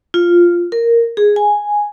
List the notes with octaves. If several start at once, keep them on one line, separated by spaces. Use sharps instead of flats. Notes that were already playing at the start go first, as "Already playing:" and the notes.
F4
A#4
G#4
G#5